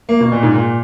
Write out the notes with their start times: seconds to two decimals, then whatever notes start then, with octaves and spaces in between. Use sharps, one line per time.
0.09 A#3
0.20 B2
0.32 A#2
0.43 G#2
0.55 A#2